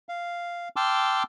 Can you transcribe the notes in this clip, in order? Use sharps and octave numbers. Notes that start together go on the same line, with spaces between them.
F5
G5 A5 C6 D6 E6 F6